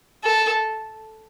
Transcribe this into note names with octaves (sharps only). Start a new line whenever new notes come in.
A4